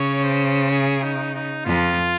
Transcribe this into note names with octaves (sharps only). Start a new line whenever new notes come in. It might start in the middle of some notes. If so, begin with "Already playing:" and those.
Already playing: C#3 C#5
C5
G#4
D#4
D#4
F2 F4